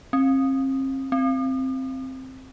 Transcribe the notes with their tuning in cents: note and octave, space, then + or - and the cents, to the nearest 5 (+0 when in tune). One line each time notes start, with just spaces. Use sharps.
C4 +40
C4 +5